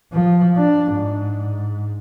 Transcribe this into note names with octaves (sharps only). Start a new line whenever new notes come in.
F3
D4
G#2